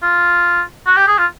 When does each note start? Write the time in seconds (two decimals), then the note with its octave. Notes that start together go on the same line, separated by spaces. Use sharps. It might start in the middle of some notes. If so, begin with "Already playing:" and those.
0.02 F4
0.86 F#4
0.96 G4
1.07 G#4
1.18 F4